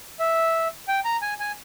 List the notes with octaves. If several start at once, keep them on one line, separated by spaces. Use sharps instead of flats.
E5
G5
A#5
G#5
G#5